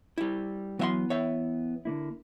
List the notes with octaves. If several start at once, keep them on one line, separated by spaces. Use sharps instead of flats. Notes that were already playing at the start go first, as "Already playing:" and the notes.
G3 E4
E3 F#3 B3 E5 C6
C#5 E5
D3 A#3 E4